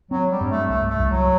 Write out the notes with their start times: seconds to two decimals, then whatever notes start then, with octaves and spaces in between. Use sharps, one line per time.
0.11 F#3 C4
0.31 G3
0.41 G2
0.50 A3
0.69 C2 A3
0.90 A3
0.99 C2
1.09 F#3